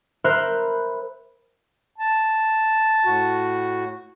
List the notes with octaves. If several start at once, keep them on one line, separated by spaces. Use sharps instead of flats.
A#4 C5 E5 B5 F#6 G6
A5
A2 F#4